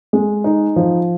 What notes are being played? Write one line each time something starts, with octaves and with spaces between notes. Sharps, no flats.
G#3
D#4
F3